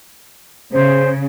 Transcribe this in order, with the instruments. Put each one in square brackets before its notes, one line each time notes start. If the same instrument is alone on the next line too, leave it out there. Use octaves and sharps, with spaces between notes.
[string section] C#3 [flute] C5